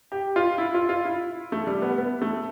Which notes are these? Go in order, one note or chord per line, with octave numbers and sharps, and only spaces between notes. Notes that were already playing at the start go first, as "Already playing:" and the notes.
G4
F4
E4
F4
F4
E4
A3
G3
B3
B3
A3